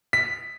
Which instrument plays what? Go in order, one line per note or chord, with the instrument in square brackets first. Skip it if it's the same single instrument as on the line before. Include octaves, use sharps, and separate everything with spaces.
[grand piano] B6